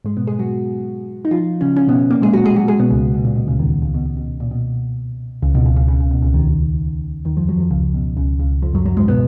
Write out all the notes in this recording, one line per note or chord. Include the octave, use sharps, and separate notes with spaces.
G#2 G#3
B2 B3
G#3 G#4
F#3 F#4
D#4
F3 F4
C#3 C#4
C#3 C#4
B2 B3
A#2 A#3
G#3 G#4
F#3 F#4
G#3 G#4
F#3 F#4
G#3 G#4
B2 B3
C#2 C#3
B2
A#2
B2
C#2 C#3
D#2 D#3
C#2 C#3
B2
B2
B2
A#2
B2
C#2 C#3
B2
C#2 C#3
C#2 C#3
C#2 C#3
C#2 C#3
B2
C#2 C#3
D#2 D#3
D#2 D#3
F2 F3
F#2 F#3
F2 F3
C#2 C#3
B2
C#2 C#3
C#2 C#3
F2 F3
F#2 F#3
F#2 F#3
G#2 G#3
B2 B3